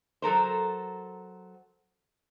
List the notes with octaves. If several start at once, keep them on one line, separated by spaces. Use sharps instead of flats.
F#3 A4 A#4 C5